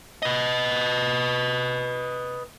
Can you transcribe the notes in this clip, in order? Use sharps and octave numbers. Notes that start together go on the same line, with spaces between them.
B4 D#5